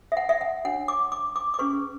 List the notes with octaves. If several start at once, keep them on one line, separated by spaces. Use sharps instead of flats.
E5
F#5
E5
F#5
D4 F#4 C#5 F#5
D6
D6
D6
D6
C#4 G#4 B4 C#6